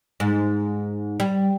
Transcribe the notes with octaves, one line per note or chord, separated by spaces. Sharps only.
G#2
G3